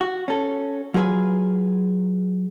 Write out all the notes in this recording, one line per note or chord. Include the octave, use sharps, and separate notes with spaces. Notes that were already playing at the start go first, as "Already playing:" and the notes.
F#4
C#4 A4
F#3 F4 G#4 B4 G#5